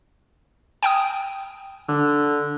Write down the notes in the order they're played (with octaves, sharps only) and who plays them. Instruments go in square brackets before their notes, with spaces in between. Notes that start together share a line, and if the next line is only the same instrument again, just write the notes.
[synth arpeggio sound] G5 G#5 D#6
[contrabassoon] D3